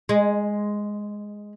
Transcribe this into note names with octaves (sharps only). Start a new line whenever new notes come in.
G#3